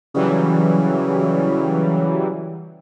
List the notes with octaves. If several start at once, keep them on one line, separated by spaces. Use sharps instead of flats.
C#3 E3 F#3 G3